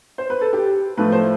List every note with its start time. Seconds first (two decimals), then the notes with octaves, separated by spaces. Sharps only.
0.18 C5
0.30 B4
0.41 A4
0.53 G4
0.97 A2 F3 A3 B4
1.12 C5